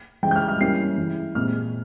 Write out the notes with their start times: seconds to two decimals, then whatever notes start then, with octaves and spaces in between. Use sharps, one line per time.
0.23 C#3 E3 G#3 G5
0.31 G6
0.36 F6
0.48 F6
0.60 G3 A#3 C#4 E4 C7
0.98 E3 G#3 E4
1.35 A#2 G#3 C4 F6